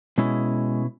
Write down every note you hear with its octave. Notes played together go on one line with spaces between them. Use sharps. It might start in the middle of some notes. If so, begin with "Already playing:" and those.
B2 G#3 C#4 E4